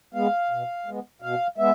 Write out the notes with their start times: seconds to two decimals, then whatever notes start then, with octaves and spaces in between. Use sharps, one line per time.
0.14 G#3 B3 F5
0.51 B2
0.86 G#3 B3
1.22 B2 F5
1.58 G#3 B3 E5